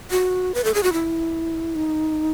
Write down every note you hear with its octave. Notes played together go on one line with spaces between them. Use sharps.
F#4
B4
A4
G#4
F#4
E4
D#4